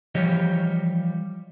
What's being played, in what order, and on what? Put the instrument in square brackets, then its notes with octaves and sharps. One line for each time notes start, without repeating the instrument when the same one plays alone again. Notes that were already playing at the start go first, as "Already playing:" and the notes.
[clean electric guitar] E3 F3 G3 G4 C#5 D#5